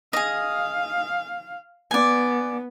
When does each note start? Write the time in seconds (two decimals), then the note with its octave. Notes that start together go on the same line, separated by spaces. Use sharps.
0.13 G#4 D#5 F5
1.91 B3 D5 G#5